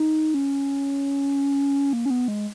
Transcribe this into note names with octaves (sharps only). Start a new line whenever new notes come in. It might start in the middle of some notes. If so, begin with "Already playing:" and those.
Already playing: D#4
C#4
A#3
C#4
B3
G#3